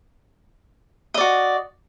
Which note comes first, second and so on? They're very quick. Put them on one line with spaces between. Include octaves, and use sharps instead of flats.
D#5 D5 F#4